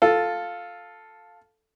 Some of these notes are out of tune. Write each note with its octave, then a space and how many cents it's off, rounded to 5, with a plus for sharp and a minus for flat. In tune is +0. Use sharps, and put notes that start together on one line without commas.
F4 +5 A4 +0